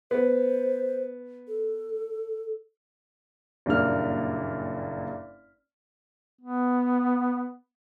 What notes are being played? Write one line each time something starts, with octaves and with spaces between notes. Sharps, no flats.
B3 C5
A4
F#1 G2 A#2 A#3 F6
B3